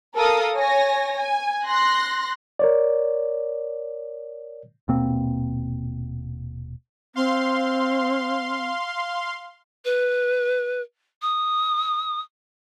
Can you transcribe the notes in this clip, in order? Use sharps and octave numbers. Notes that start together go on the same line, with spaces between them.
A4 A#4 F5 D#6
C#5 G#5 A#6
G#5
C6 F#6 A#6
A#4 C#5 D5
D#1 B2 A#3 C4
C4 F5 C6
B4
D#6